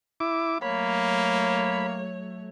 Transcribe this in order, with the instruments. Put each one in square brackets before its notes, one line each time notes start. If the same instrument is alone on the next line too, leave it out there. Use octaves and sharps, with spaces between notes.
[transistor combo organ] E4 D6
[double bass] F#3 A3 [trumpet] A#3 [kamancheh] C#5 [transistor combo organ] B5